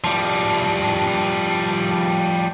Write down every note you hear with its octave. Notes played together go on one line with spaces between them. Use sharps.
F3 G3